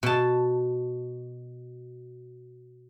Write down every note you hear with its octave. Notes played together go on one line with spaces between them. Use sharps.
B2 A5